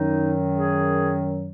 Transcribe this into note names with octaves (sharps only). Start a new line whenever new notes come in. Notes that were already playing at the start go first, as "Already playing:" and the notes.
Already playing: F#2 D#3 F#3 D#4
G#4